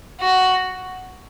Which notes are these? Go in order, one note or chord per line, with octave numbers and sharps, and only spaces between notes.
F#4